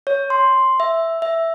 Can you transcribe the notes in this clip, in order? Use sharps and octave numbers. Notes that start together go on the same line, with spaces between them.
C#5
C6
E5
E5